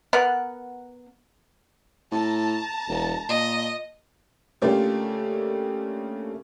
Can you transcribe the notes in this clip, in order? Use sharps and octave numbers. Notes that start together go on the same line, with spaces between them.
B3 A#4 F#5
A2 A5 A#5
E1
A#2 D#5
C#3 A3 A#3 D4 F4 G4